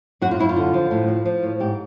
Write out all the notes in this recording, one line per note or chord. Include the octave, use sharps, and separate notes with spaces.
F#2 F#4
F4
F#2 E4
F4
D3
F3
A2
F3
F3
A2
G#2 G4